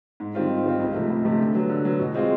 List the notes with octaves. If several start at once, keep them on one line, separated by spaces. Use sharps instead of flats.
G#2
D#3 G3 C4 F4
G#2
D#3 G3 C4 F4
C#2
C3 F3 A3
C#2
C3 F3 A3
D3
F#3 B3
D3
F#3 B3
B2
G#3 C4 F4